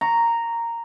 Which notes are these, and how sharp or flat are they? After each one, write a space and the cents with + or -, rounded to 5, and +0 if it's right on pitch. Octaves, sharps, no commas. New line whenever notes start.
A#5 -5 C#6 +5